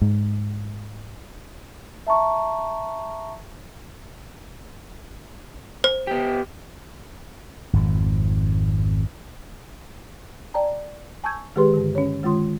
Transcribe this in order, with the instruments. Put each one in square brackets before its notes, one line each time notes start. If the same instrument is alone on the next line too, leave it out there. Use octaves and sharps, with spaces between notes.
[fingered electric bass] G#2
[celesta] E5 A5 A#5 C#6
[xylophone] C5
[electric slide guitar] B3 G4
[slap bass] G#1 F2
[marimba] D5 G5 A5 A#5
G#5 A5 C#6 E6 G6 G#6
D#3 G#3 G4 G#4 B4 C6
G2 D3
C#4 C#5
D#3 G#3 F4 C6